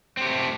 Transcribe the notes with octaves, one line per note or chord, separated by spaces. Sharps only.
A3 C4 G4